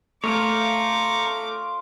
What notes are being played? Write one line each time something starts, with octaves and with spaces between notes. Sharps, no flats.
A3 F4 A#4 C#5 A#5 C#6 D6